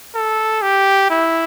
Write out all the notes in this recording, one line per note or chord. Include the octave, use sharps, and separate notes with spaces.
A4
G4
E4